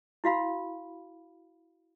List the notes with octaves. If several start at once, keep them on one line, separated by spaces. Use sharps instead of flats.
E4 F#4 F5 B5